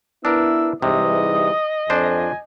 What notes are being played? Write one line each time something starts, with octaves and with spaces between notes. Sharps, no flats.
B3 D4 E4 A#4 E6
G#2 C3 E3 G3 D#5 D#6
F2 D4 C5 G#5